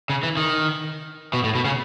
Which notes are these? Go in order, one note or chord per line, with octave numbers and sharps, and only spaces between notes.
C#3
E3
D#3
B2
A2
B2
C#3